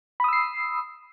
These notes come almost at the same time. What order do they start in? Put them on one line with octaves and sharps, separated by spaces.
B5 D#6 E6 C7